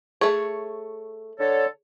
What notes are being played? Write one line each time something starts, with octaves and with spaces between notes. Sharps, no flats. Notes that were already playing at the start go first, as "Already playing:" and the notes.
A3 G#4 C#5
D3 A4 C#5